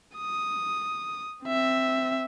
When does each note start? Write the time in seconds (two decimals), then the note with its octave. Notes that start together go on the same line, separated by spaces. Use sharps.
0.17 D#6
1.44 C4 E5